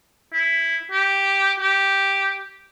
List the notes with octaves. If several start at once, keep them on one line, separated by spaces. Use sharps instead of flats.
E4
G4
G4